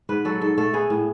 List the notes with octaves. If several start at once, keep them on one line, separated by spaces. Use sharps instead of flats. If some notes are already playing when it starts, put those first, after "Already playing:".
G#2 B4
F#3 A4
G#2 A4
A3 A4
B3 G#4
A2